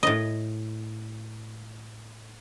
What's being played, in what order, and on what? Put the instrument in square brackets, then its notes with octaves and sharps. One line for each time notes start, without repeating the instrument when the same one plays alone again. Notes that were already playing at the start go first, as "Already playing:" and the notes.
[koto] A2 D#5